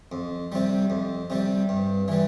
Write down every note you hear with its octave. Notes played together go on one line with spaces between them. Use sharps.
F2
C3 G3
F2
C3 G3
G2
E3 G3